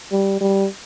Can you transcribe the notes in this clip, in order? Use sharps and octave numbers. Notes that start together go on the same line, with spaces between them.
G3
G3